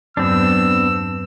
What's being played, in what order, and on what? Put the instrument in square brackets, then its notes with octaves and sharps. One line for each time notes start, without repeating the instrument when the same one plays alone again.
[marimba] E2 G2 F#3 [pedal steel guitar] B3 C4 D4 [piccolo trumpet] E6